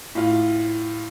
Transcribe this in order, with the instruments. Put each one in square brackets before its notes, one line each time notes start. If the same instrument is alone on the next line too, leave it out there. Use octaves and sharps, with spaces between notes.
[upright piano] A2 F4